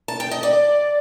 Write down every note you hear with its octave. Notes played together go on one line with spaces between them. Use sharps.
A5
G5
D#5
D5